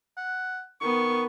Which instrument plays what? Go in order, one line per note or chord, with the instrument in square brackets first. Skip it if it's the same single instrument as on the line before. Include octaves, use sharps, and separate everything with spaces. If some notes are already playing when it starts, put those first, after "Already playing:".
[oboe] F#5
[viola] D#3 B3 [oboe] C#6